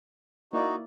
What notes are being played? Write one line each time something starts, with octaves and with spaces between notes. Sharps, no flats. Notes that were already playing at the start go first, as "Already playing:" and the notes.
A#3 D#4 E4 F#4 D5